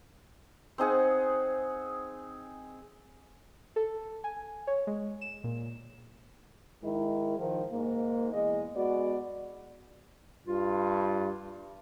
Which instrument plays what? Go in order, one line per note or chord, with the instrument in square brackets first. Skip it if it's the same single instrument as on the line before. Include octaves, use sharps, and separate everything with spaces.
[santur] C4 D#4 G#4 F#5
[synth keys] A4
G#5
C#5
G#3
E7
A#2
[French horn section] G#2 D#3 G#3 E4
D#3 F3
G#2 A#3
E2 G#3 D#5
G#3 B3 F#4 D5
[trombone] G2 [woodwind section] F4